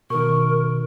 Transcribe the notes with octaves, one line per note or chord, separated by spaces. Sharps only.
B2 D#3 A#4 C#6